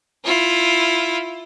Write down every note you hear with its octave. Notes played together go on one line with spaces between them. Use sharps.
E4 F4